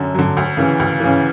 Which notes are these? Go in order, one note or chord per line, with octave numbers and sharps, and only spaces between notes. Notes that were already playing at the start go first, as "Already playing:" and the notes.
Already playing: F#2 D3
D3 F#3
D2
C#3 E3
D2
E3
C#3